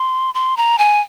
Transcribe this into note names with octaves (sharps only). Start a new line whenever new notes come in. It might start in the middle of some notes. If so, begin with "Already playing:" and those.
Already playing: C6
C6
A#5
G#5